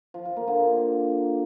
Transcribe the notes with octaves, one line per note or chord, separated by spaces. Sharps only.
F3
F3
A#3
D3